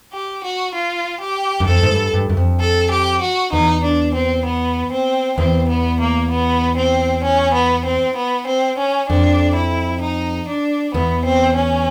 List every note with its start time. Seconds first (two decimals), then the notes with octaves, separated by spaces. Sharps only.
0.13 G4
0.44 F#4
0.75 F4
1.21 G4
1.60 F#2
1.68 F2 A4
1.83 G#2
1.91 G2
2.14 G2
2.30 F#2
2.37 F2
2.60 A4
2.91 G4
3.22 F#4
3.53 E2 D#4
3.84 D4
4.15 C4
4.45 B3
4.92 C4
5.38 E2 C4
5.69 B3
6.01 A#3
6.31 B3
6.77 C4
7.24 C#4
7.55 B3
7.85 C4
8.16 B3
8.47 C4
8.78 C#4
9.09 F2 D4
9.55 E4
10.01 D#4
10.48 D4
10.94 E2 B3
11.25 C4
11.56 C#4